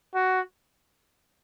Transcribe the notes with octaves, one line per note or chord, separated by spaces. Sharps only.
F#4